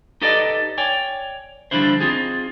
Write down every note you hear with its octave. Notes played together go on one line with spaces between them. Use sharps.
D#4 G4 A4 B4 D5 D#5
C#5 D5 G5 G#5
D3 F3 G3 D4 E4 C5
C4 D#4 F4 G#4